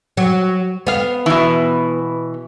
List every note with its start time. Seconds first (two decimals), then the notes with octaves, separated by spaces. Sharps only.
0.17 F#3
0.87 B3 F5
1.26 B2 E3